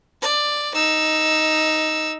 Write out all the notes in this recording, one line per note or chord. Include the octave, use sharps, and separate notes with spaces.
D5
D#4 E6